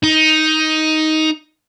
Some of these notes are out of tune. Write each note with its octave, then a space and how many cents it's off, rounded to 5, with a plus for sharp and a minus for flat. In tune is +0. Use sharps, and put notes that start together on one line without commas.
D#4 +10